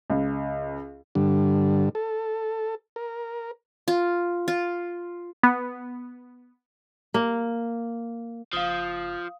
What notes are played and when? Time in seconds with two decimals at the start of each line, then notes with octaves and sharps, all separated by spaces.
0.10 C#2
1.15 G2 D3
1.95 A4
2.96 A#4
3.88 F4
4.48 F4
5.43 B3
7.14 A#3
8.53 F#1 F3 F5 D#6